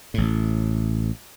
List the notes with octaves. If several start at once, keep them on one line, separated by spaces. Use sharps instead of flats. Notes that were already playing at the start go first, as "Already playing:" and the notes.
A1 A2